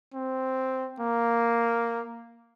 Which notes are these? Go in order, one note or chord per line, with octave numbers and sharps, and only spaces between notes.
C4
A#3